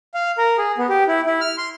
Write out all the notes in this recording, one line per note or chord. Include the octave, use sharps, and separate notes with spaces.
F5
A#4
G#4
B3
G4
E4
E4
F6
C6